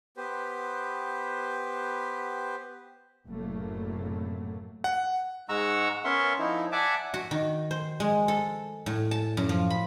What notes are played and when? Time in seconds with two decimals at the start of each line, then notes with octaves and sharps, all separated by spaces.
0.17 B3 G4 B4 C5
3.26 F#1 A2 C3 F#3 A3 A#3
4.84 F#5
5.49 G#2 G#3 F#5 A#5 C#6 E6
6.05 B3 C#4 A#4 E5 C6 C#6
6.39 F3 D#4 E4
6.72 D5 E5 F#5 G#5 A5 D6
7.14 F#4
7.31 D#3
7.71 C5
8.00 G#3
8.28 A4
8.86 A2
9.11 A5
9.37 F#2
9.49 F3
9.70 B5